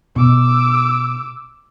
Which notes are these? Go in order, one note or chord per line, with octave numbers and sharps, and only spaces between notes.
B2 D6 E6